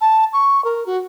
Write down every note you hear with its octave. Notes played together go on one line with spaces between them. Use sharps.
A5
C#6
A#4
F#4